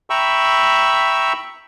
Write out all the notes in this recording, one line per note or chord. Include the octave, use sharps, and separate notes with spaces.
E5 G5 A#5 B5 C#6 E6